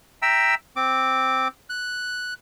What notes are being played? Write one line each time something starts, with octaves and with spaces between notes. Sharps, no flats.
E5 G5 A#5 E6
C4 D6
F#6